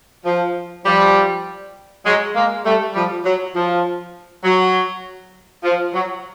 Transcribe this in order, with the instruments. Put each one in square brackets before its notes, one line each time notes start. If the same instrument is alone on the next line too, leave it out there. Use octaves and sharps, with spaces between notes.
[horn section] F3
F3 G3
F#3 G#3
G#3 A#3
G3 A3
F3 G3
F#3
F3
F#3
F3
F#3